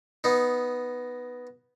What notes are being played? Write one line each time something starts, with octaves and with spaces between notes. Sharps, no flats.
B3 D#4